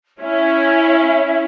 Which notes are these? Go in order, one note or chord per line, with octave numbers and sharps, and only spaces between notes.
C#4 E4 E5